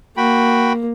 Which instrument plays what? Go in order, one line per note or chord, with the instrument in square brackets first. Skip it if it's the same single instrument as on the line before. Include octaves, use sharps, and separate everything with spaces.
[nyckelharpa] A#3 [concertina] F#4 G5 B5